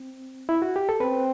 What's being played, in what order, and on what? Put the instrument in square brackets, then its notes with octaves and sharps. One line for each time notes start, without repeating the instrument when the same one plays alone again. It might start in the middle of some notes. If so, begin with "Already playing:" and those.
Already playing: [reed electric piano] C4
E4
F#4
G4
A4
[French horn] C4 [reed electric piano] B4